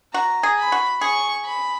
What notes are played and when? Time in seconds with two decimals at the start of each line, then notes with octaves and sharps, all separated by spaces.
0.14 F#4 A#5
0.43 G#4
0.58 B5
0.72 F#4
1.01 G#4 C#6
1.45 B5